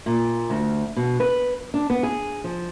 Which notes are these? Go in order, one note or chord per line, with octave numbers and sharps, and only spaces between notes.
A#2
D2
B2
B4
D4
B3
G#4
F3